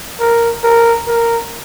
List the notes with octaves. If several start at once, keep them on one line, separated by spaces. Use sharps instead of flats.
A#4
A#4
A#4